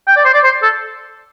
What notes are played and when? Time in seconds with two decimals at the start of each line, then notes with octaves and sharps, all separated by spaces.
0.08 G5
0.17 D5
0.25 C5
0.34 D5
0.44 C5
0.63 A4